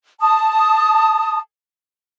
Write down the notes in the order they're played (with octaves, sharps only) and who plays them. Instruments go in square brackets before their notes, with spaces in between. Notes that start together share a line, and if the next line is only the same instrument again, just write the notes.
[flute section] A5 D#6